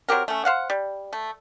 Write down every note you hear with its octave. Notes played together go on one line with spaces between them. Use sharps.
F#3 C4 G4 A#4
A3 C#4
C5 F5 F#5
G3
A3